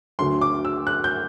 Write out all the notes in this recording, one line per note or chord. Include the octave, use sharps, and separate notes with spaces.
D2 D3 F#3 C6
D6
E6
F#6
G6